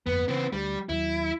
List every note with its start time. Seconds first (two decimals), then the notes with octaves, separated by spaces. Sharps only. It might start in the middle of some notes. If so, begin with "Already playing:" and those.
0.06 G1 F2 A#3 B3
0.28 C#3 E3 B3 C4
0.53 D2 G3
0.89 D#2 F#3 E4